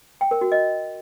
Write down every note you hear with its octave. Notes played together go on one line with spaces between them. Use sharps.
G5
A#4
F#4
D#5